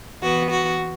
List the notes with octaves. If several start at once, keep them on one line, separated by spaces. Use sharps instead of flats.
E3 B3 F#4
F#4